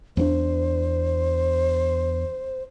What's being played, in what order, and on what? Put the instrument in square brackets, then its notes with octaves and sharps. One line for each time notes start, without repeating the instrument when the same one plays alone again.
[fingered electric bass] E2 B3 D4 [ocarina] C5